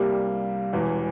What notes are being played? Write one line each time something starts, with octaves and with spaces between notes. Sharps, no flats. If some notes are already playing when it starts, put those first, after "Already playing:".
Already playing: C2 C3 G3 A#3
E1 E2 E3